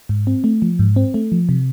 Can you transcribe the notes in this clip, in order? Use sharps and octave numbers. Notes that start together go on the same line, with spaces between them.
G#2
C4
A3
F3
G#2
C4
A3
F3
C3